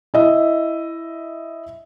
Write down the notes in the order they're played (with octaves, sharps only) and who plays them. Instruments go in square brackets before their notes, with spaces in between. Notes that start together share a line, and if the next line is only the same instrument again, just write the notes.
[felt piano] E4 D#5 E5